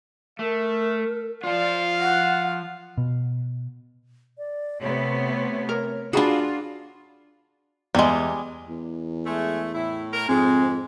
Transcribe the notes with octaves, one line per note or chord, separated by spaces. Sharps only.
A3 A#4 E5
F3 F4 D5 F5
F#5
B2
D5
C3 A3 B3 C#5
A#4
D4 F4 F#4 G#4 A#5 B5
E2 G3 G#3
E2
G#3 A3
A2 E4
A#4
F2 G#2 G#3 C4